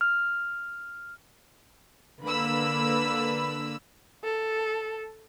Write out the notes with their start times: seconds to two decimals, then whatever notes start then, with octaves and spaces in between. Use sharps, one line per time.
0.01 F6
2.23 D3 A#3 B4 B5 E6
4.24 A4